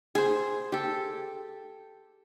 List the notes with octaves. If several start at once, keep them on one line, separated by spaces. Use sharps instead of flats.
G#4 C5
G4 A4